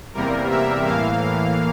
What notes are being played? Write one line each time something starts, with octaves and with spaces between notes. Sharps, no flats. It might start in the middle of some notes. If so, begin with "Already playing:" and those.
E2 C3 G3 A#3 A#4
E5
A2 E3 A#3 F5